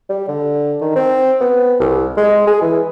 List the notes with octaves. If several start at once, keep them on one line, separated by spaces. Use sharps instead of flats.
G3
D3
D#3
C4
B3
C2
G#3
G#4
E3